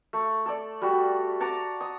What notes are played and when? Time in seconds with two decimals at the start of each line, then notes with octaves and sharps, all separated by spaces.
0.13 A3
0.46 A4 D5
0.82 G3 F#4
1.40 F#5 A5 A#5 D6
1.81 D#6